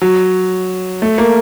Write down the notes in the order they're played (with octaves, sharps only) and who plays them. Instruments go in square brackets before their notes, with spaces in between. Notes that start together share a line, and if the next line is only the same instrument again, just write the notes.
[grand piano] F#3
A3
A#3